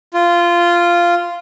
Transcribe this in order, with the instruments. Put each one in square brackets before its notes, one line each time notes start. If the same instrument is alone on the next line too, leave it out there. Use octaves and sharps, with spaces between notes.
[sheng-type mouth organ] F4